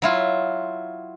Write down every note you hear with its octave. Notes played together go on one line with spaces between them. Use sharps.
F#3 E4 F4